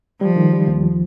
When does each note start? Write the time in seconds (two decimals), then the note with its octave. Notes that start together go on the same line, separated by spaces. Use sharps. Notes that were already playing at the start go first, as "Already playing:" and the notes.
0.21 F3 G3
0.36 D#3
0.53 G3
0.68 D#2
0.83 F3